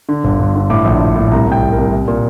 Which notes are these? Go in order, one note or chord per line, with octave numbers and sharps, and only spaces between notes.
D3
G1
G1
D3
A2 D6
A#1
A2
A2
C2 A#5
C2
G5
C2
A#4
C2
C2
A#2